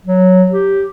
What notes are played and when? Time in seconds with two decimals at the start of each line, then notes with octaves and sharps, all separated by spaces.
0.05 F#3
0.51 G4